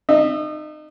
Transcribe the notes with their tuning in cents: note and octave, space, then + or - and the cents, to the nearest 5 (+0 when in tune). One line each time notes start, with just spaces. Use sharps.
D#4 -30 E5 +0